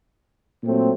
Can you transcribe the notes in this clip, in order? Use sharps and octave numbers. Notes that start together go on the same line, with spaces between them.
A#2 F#3 A3 C4